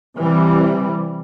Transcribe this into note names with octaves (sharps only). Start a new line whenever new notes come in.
C3 E3 G3